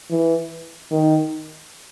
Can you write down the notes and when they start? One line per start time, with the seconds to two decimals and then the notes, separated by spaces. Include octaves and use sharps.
0.10 E3
0.92 D#3